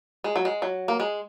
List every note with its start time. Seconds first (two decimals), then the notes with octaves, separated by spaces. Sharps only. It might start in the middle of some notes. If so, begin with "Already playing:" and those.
0.24 G#3
0.36 F#3
0.45 G#3
0.62 F#3
0.88 A#3
1.00 G#3